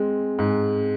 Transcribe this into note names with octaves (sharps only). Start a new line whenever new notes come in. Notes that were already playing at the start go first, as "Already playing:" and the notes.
Already playing: G#3 C4
G#2